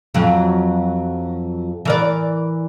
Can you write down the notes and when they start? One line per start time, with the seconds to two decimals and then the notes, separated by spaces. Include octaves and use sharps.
0.14 F2 F#3
1.85 E3 A#4 D5